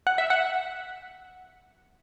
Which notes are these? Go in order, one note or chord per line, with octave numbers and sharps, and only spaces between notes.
F#5
E5
F#5